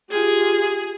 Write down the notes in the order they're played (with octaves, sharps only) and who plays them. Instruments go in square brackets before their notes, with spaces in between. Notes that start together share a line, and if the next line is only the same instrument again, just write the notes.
[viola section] F4 G4 [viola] G#4